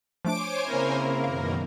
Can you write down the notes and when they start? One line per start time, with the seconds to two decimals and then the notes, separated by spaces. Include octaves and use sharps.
0.25 F3 A3 D4 C5 C#5 G#5 D6 D7
0.67 C#3 A#3 C4 E4 A#4
1.24 F#2 B2 D#3 F5